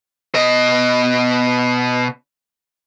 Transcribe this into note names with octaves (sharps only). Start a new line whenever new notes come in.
B2 D#5